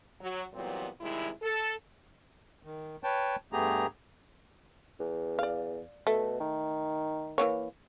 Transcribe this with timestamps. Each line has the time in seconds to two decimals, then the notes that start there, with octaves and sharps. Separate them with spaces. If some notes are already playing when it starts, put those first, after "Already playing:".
0.21 F#3
0.54 A#2 E3 F#3 G3 B3 C4
1.01 C3 D#3 G3 G#3 E4
1.42 A4
2.63 D#3
3.04 B4 C#5 G5 A5
3.53 G2 A3 B3 G4 G#4 A#5
5.00 E2
5.39 D5 F5
6.07 B2 A3
6.40 D#3
7.38 E3 A#3 C#5